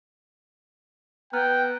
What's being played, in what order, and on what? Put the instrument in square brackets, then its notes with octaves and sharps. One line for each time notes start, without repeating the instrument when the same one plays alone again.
[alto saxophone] B3 [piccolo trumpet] G5 [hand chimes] A#5 F6 F#6